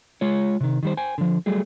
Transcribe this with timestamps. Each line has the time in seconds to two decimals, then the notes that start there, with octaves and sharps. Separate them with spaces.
0.21 G#3 F4 C#5
0.60 C3 D#3
0.83 D#3 G3 C5
0.97 C5 G5 G#5
1.18 D3 F3
1.46 F#3 G3 A3 G#4